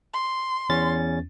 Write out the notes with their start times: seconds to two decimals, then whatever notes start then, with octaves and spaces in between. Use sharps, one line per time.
0.13 C6
0.69 E2 C#4 A6